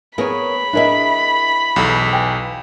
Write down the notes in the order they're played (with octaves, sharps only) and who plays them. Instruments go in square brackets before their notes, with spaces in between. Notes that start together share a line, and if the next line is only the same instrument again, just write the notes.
[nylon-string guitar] B3 G#4 [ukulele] A#4 C#5 [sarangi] B5
[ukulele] D4 G#4 D#5 [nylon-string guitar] E4 A#4 E5
[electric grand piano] B1 E2 [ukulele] G4 A4
[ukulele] B4 G5 G#5